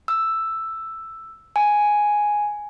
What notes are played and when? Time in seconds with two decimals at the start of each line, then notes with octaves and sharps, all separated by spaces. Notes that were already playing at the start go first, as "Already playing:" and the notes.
0.08 E6
1.56 G#5